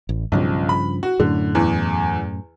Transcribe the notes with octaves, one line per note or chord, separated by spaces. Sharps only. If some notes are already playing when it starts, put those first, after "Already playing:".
A1
B1 G2 C#3 F3
B5
F#4
F#2 A2 D3
E2 E3